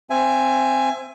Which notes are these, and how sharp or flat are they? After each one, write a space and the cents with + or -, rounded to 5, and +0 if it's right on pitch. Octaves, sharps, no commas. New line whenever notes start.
C4 +0 E5 +30 G#5 +0